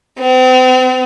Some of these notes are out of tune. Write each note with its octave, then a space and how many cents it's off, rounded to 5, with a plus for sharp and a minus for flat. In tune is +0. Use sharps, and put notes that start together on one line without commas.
C4 -40